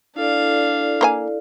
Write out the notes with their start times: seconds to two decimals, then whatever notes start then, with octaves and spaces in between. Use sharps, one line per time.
0.16 D4 E4 A4 D5 F5
1.01 A#3 C5 G#5